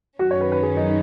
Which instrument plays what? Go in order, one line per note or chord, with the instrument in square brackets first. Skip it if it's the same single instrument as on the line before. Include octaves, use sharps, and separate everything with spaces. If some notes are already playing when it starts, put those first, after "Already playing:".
[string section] F#2 D#3 F#3 C#4 [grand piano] F#4
[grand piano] C#5
B4
B4
G#4
D#4